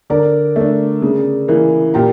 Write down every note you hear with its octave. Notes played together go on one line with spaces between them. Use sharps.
D3 A#4 D5
A3 D4
C#3
E3 A#3
A#2 G4 A#4